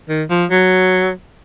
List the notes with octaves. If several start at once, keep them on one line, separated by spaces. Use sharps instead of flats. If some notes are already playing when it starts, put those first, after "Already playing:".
D#3
F3
F#3